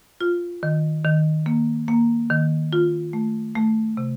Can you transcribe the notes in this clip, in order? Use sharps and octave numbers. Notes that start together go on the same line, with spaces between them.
F4
D#3
D#3
A#3
A#3
D#3
F4
A3
A3
C3